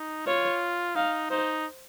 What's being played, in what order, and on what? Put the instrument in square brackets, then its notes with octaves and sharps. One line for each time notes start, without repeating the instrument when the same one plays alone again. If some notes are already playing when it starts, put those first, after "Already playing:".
Already playing: [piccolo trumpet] D#4
[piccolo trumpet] F4 [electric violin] C#5
[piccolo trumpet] D#4 [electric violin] F5
[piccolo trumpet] D#4 [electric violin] C5